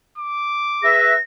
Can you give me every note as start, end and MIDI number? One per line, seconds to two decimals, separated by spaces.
0.18 0.92 86
0.83 1.14 68
0.83 1.14 71
0.83 1.14 76
0.83 1.21 94